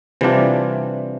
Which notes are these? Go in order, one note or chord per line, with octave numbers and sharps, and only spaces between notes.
C3 E3 G3 D4 F4